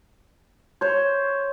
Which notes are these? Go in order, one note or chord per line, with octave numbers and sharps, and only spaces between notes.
C5 C#5